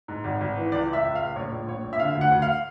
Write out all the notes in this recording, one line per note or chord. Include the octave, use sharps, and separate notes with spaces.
G#2
G#1
G#1
E3
C#2 D5
C#2
E5
C#2
C#2 F5
A#1 C#5
A#1
A#1 C#5
A#1
E5
D3 F5
D2
F#5
D2
F5